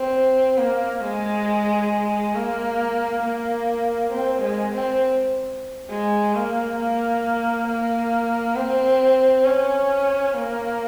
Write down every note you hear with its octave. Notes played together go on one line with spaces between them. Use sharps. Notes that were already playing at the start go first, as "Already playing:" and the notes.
Already playing: C4
A#3
G#3
A#3
A#3
C4
G#3
C4
G#3
A#3
A#3
A#3
C4
C#4
A#3